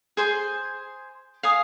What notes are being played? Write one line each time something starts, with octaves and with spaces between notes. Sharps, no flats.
G#4 C5 G#5
F5 G#5 D#6